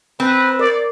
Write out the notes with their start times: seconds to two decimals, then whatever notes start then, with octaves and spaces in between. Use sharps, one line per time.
0.20 C4 B4
0.59 A#4 D5